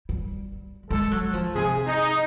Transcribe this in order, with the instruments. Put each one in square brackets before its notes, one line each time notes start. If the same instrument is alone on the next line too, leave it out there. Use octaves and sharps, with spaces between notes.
[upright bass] G3
[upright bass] G#3 [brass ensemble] A4
[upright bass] F#3
F3
[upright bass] C3 [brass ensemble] G#4
[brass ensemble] D#4